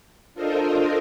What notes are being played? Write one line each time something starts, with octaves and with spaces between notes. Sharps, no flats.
D4 F4 A4 A#4 C5 D#5